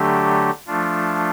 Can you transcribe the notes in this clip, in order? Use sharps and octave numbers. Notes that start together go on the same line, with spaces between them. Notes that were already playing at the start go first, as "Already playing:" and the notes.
Already playing: D3 F#3 A3 D4 G4
F3 A3 D4 F4